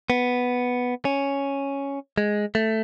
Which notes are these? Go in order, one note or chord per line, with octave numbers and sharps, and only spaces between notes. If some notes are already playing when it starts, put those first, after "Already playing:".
B3
C#4
G#3
A3